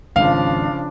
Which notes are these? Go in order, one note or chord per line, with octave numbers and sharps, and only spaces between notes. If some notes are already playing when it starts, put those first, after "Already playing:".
G#1 C#3 F3 D4 F5